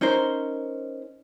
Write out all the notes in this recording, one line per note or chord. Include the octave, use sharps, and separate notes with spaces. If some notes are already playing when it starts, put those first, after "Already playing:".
C#4 D#4 A#4 C5